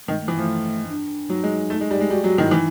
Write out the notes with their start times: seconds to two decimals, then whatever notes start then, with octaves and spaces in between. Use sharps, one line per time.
0.08 D#3 G#3
0.21 A3
0.28 E3
0.35 F3 A3
0.88 D4
1.30 F#3 D#4
1.43 G#3
1.70 A3
1.81 G#3
1.91 G3
2.01 G#3
2.10 G3 F#4
2.24 F#3 F#4
2.38 D#3 E4
2.51 E3 D#4